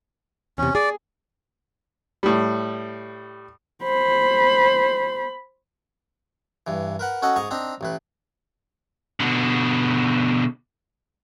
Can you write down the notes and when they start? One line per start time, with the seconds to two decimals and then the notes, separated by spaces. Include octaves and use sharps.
0.58 E2 C3 C#4
0.75 G#4 D5
2.23 A2 G3
3.84 C5 B5
6.67 G2 E3
6.99 A#4 B4 F#5
7.22 C#4 F#4 A4 D#5 F#5
7.36 G#2 D#5 A#5 C#6
7.51 C4 D4 D#4 A#5
7.81 A1 A2 B4
9.20 B2 D3